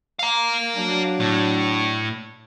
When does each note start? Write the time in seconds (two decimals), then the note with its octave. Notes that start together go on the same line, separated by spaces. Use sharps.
0.19 F5 A#5
0.76 F#3 D4
1.20 A2